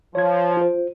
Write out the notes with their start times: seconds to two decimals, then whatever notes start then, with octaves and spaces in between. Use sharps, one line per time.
0.15 F3 C#5 G#6
0.57 F4 C5